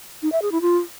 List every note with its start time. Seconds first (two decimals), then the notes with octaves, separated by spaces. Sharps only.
0.22 D#4
0.32 E5
0.42 G#4
0.52 E4
0.61 F4